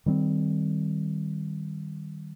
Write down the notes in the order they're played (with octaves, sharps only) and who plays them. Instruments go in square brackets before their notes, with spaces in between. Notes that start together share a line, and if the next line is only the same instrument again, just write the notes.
[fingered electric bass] D#3 G3 B3 C4